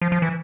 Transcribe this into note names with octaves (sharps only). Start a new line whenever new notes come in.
F3
F3
E3